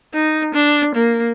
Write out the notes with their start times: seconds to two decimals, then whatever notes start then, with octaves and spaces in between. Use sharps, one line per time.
0.14 D#4
0.54 D4
0.95 A#3